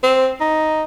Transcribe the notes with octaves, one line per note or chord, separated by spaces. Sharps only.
C4
D#4